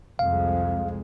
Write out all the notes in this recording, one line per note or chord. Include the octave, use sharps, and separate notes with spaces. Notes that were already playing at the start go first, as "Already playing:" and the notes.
C2 F2 G#3 F5